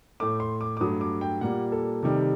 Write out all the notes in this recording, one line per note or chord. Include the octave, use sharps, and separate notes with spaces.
A2 A3 D6
C6
D6
D6
G2 F#3 A3 D#6
D6
G5
A#2 G3 A#3 F#5
A4
C3 D#3 G3